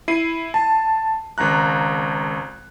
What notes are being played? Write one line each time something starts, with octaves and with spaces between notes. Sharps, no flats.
E4 C7 D#7
A5
G#1 C#2 A#5 F#6